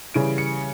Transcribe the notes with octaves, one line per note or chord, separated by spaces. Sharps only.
C#3 E3 G3 D7
C#7